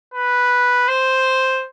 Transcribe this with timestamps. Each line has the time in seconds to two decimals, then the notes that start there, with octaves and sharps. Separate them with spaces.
0.14 B4
0.88 C5